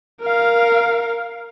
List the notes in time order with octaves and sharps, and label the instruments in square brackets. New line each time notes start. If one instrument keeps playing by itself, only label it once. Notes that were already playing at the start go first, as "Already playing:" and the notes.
[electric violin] A#4 F5